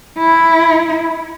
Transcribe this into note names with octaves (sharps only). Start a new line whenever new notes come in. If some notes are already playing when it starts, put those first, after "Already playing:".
E4